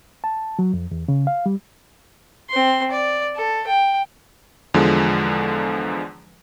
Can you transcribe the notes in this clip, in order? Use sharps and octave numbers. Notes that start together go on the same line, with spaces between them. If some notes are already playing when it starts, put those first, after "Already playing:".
A5
F#3
F2
E2
C#3
F5
G3
C4 C6
D5
A4
G5
E2 D3 F3 G#3